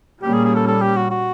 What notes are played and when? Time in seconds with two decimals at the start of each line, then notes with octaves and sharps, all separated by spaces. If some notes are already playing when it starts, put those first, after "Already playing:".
0.22 A#2 G3 A#3 C#4 G4
0.34 G#4
0.45 G#4
0.56 A4
0.67 A4
0.82 G4
0.97 F#4
1.11 F#4